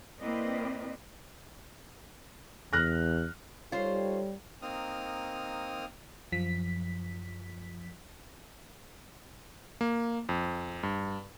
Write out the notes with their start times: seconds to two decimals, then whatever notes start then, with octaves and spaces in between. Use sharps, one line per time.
0.20 A#3 C4 E4 B4 D5 D#5
2.73 E2 F6 F#6 A#6
3.72 G3 D#4 F4 A4 C5 C#5
4.62 A#3 C4 D#4 D#6 F6
6.32 F#2 F3 B6
9.81 A#3
10.29 F2
10.83 G2